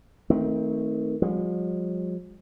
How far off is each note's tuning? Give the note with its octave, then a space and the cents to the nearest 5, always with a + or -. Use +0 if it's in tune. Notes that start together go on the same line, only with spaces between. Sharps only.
D#3 +25 A3 +5 C4 +0
F3 +45 G#3 -45